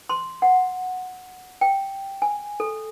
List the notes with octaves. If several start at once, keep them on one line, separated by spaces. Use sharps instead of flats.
C6
F#5
G5
G#5
A4